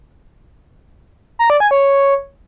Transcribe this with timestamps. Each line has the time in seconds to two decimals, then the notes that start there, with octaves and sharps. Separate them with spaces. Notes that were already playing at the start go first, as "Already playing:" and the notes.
1.39 A#5
1.50 D5
1.60 G#5
1.71 C#5